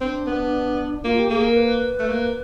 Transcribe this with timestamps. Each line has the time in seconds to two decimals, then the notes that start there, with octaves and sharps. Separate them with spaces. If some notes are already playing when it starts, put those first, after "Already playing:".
0.01 C4 D4
0.27 B3
1.04 A#3 F4
1.17 G4
1.30 A#3 G#4
1.44 A#4
1.56 B4
1.99 A3
2.08 A#3